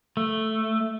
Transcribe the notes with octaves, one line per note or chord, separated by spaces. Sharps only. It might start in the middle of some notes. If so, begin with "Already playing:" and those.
A3